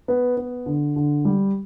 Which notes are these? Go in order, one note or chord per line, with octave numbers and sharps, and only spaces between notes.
B3
B3
D3
D3
G3